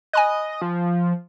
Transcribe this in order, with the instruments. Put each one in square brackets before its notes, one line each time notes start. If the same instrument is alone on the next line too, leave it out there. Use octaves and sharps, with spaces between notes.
[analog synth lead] D#5 [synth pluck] G#5 B5 F#6
[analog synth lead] F3